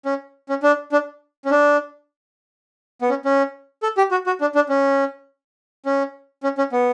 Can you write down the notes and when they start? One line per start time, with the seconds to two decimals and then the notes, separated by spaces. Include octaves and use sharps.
0.05 C#4
0.49 C#4
0.63 D4
0.92 D4
1.45 C#4
1.51 D4
3.02 B3
3.10 C#4
3.25 C#4
3.83 A4
3.97 G4
4.11 F#4
4.26 F#4
4.41 D4
4.55 D4
4.69 C#4
5.86 C#4
6.43 C#4
6.58 C#4
6.72 B3